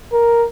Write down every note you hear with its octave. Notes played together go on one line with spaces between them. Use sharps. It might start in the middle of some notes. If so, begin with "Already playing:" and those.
A#4